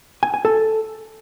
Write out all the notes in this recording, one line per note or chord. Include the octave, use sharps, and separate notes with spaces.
G#5
G#5
A4